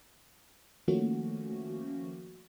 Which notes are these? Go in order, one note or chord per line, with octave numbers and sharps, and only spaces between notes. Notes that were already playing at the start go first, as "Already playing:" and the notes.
D#3 F3 A3 A#3 C#4 F#4